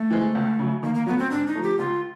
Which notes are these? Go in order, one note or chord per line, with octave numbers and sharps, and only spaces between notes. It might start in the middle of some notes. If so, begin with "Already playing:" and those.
Already playing: A3
E3 G#3 C4
C#2
C#3 F#3
D#3 A#3
A#3
F#3 A3 B3
C4
G#2 D4
D#4
F3 A3
G4
C#2 F4